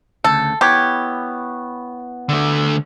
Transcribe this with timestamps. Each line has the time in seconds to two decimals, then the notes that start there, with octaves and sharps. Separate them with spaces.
0.24 D2 C#3 A4
0.61 B3 E4 G4 C#5
2.29 D3 A3